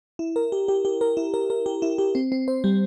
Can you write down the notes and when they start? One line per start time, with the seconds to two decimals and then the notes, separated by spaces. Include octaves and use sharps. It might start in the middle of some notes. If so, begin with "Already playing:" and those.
0.19 E4
0.36 A#4
0.52 G4
0.68 G4
0.85 G4
1.01 A#4
1.17 E4
1.34 A#4
1.50 A#4
1.66 G4
1.82 E4
1.98 G4
2.15 C4
2.32 C4
2.48 C5
2.64 G3